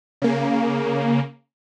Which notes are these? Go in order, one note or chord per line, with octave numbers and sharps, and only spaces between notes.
C#3 A#3